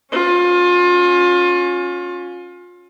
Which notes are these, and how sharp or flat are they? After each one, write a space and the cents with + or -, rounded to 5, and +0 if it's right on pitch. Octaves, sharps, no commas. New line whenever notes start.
C#4 +0 F4 +30